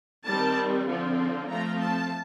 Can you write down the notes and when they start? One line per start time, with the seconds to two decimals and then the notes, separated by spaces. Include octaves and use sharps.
0.24 D#3 G3 C4 A5
0.85 D3 F3 C4
1.47 F3 A3 C4 A#5
1.78 A5